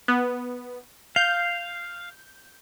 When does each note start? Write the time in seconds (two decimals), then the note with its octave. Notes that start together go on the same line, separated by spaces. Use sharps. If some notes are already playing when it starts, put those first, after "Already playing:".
0.08 B3
1.16 F5 G6